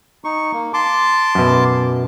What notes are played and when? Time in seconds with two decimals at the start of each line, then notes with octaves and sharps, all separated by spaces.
0.24 D#4 C#6
0.53 A#3
0.74 A5 C6 D6
1.35 F#2 B2